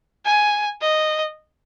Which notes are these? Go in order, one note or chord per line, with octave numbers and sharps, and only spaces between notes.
G#5
D#5